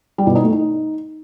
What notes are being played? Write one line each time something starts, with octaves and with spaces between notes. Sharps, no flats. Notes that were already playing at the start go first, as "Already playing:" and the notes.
G3
B2
D#4
A3
D#4